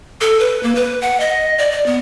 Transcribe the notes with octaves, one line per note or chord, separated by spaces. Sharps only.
A4
B4
A#3
B4
F#5
D#5
D5
D5
B3